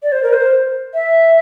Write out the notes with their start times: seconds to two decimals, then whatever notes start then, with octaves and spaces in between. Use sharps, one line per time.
0.03 D5
0.12 C5
0.23 A#4
0.33 C5
0.94 E5